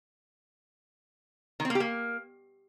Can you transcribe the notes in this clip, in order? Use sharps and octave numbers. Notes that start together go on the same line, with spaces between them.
D#3
C4
A#3
G4
A#3